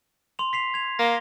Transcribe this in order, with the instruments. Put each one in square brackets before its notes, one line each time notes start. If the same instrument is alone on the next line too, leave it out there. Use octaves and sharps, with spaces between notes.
[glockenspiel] C6 F7
B6 C7 F7
G#6 F7
[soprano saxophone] A#3 [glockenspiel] A#6 G7